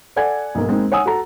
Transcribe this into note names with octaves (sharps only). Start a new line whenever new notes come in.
A4 D5 F#5 G#5 G#6
B1 G#2 A#3
G#3 A#3 C4 D#4
C#5 F#5 G#5 D#6 E6
F#4 A4 A#5